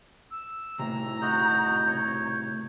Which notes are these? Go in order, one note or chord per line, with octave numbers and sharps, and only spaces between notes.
E6
A2 C3 A#5
F#4 D#5 G6
C#5